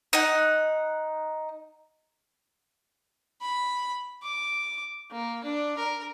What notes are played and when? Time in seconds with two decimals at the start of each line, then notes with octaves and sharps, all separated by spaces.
0.13 D#4 F#5
3.42 B5
4.23 D6
5.11 A#3
5.44 D4
5.77 A#4